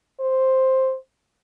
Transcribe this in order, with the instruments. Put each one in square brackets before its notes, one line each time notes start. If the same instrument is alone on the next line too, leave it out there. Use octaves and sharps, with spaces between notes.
[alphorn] C5